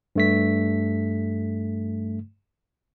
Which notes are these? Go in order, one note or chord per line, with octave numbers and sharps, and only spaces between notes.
G2 A3 B6